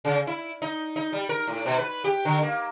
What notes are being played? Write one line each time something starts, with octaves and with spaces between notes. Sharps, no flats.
C#3
E4
D#4
D#4
G3
A#4
A2
B2
B4
G4
D3
A#3